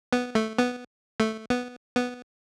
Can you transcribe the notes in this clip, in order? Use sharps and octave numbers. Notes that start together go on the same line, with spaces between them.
B3
A3
B3
A3
B3
B3